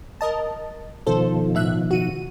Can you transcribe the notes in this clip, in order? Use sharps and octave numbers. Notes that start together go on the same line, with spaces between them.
A#4 D#5 A5
B2 D#3 F3 A4 C5
A2 E5 F#6
F#4 D#7